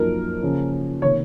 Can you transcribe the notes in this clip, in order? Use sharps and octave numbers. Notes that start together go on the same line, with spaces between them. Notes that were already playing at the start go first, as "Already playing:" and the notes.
Already playing: F#2 F3 A#3 D#4 A#4
C#3 F3 A#3 C#4 F4
C3 D#3 A#3 C#5